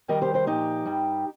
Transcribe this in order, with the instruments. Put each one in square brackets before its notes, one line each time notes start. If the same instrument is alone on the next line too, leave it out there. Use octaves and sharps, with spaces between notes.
[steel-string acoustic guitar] F2 D#3 G3 A#4 D#5
G4 C5
G4 C5
A#2 F3 D#4 G4
G2 G3